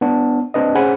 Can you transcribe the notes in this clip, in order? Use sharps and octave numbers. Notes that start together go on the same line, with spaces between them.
B3 D4
C4 D4 B4 D#5
C#4 G#4 C5 F#5 G#5 B5